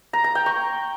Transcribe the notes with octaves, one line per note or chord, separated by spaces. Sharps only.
A#5
A#5
G5
C#6